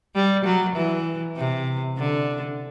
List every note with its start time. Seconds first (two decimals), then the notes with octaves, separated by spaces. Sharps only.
0.15 G3
0.45 F#3
0.76 E3
1.36 C3
1.98 D3